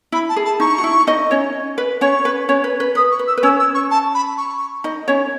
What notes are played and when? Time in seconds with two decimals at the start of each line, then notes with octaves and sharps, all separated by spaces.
0.12 E4 B5
0.29 A5
0.36 G#4
0.45 A5
0.60 D#4 C#6
0.78 F#4
0.84 E4
1.07 D#4 D#5
1.31 C#4 C#5
1.78 B4
2.01 C#4 C#5 C#6
2.25 B4
2.49 C#4 C#5
2.64 B4
2.80 B4
2.95 B4 D#6
3.11 C#6
3.19 B4
3.27 E6
3.38 B4
3.43 C#4 C#5 E6
3.59 E6
3.74 C#6
3.90 A5
4.14 B5
4.37 C#6
4.84 D#4 D#5
5.08 C#4 C#5